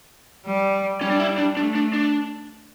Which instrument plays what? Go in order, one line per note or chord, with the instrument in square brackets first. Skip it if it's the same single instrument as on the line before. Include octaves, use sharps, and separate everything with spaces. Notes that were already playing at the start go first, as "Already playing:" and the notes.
[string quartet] G3
[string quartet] G3 [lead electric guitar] C#4
[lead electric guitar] D4
E4
D4
[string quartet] A3 [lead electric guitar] D4
[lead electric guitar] D4
D4